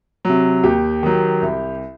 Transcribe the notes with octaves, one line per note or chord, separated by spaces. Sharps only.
C3 F#3
D#2 G4
D#3 F#3
C2